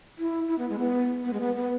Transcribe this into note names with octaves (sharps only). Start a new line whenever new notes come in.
E4
E4
B3
G#3
B3
B3
G#3
B3
B3